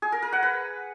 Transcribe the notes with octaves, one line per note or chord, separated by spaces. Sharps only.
G#4
A#4
A#4
F#5
B4